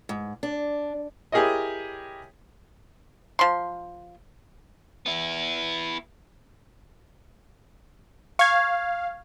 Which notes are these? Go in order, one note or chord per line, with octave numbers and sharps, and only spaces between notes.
G#2
D4
E4 G4 G#4 A#4 C#5 D#5
F3 C6
B3 E4
F5 C#6 G#6